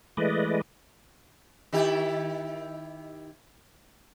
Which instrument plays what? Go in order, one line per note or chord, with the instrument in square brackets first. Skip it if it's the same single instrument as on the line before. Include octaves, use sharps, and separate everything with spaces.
[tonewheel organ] E3 G#3 A3 B4 D5 D#5
[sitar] D#3 E4 G4